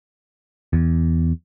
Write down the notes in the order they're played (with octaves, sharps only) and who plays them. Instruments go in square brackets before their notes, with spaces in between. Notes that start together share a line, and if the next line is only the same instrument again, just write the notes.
[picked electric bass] E2